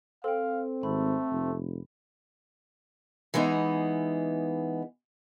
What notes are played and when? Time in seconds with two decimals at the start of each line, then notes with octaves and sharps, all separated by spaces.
0.24 C4 A4 F5 G5
0.83 G#1 A3 B5
1.31 F1
3.34 E3 G#3 B3 D#4